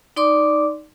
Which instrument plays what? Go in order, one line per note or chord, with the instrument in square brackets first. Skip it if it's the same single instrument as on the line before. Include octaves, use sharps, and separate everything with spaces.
[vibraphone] D#4 D5 C6 D6